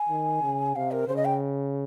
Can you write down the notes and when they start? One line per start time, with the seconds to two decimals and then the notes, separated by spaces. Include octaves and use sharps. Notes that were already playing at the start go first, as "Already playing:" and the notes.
Already playing: G#5
0.09 D#3
0.42 C#3
0.75 C3 F5
0.91 A#4
1.08 C#3 C5
1.16 D#5
1.25 G5